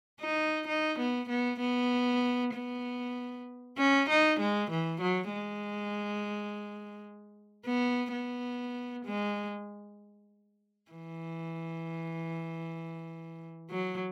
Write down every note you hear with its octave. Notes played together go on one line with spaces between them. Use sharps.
D#4
D#4
B3
B3
B3
B3
C#4
D#4
G#3
E3
F#3
G#3
B3
B3
G#3
E3
F#3